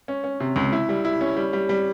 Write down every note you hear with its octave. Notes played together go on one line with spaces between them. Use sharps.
C#4
C#4
C3
C#2
E4
G3
E4
C#4
G3
G3
G3